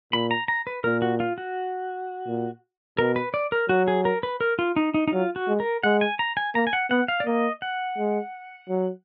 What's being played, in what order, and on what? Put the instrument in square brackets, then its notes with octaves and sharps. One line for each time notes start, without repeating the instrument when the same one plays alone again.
[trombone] A#2 [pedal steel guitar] B5
[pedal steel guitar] A#5
A#5
B4
[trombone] A#2 [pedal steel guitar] A#4
[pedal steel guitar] F#4
F4
F#4
[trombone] A#2
[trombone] B2 [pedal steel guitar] A#4
[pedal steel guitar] B4
D5
A#4
[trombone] F#3 [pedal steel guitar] F#4
[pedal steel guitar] G#4
A#4
B4
A#4
F4
D#4
D#4
D#4
[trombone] F#3 [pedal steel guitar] F4
[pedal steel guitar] F#4
[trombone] G#3
[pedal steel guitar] A#4
[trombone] G#3 [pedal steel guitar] F#5
[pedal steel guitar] G#5
A#5
G#5
[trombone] A#3 [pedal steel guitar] A#5
[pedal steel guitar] G#5
F#5
[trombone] B3 [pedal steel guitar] F#5
[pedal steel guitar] F5
D5
[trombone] A#3 [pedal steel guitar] D#5
[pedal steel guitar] F#5
[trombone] G#3
F#3